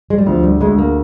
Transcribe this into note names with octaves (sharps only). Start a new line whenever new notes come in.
G#3
G3
D2 F3
G3
D2 G#3
A#3